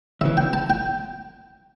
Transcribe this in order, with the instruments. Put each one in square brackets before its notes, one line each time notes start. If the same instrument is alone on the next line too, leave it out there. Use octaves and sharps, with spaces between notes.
[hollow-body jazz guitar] D2 C#3 E3 [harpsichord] E5
[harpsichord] G5
A5
G5